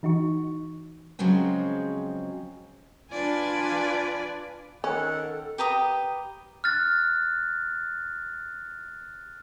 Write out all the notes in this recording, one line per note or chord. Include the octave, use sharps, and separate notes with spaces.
E3 D#4 F#4 C#6
C#3 F3 F#3 G#3 C4
D4 F4 B4 D5 G#5
D#3 C#4 A4 F#5
G4 B4 A#5 D#6
F6 F#6 A6